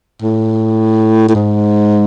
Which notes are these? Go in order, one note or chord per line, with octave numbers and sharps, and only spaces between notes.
A2
A2
G#2